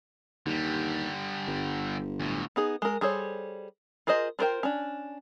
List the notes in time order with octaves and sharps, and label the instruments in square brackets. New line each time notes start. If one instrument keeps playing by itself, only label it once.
[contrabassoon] D#2 [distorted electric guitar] D3 G3
[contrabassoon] G1
[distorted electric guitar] D2 A2
[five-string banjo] B3 D#4 G#4
G#3 A#4
G3 G#4 A4 C5 C#5
F4 G#4 A#4 C5 D#5
D4 F4 A#4 C5 G5
C#4 D4